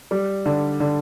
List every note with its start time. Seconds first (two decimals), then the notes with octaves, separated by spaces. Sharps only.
0.11 G3
0.46 D3
0.80 D3